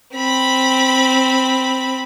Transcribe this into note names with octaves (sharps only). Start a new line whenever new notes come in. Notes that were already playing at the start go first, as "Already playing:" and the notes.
C4 B5